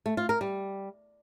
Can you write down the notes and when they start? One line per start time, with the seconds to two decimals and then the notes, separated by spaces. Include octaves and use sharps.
0.06 A3
0.17 F4
0.29 A#4
0.41 G3